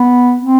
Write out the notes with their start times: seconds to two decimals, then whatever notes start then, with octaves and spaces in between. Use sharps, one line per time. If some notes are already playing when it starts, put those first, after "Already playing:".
Already playing: B3
0.41 C4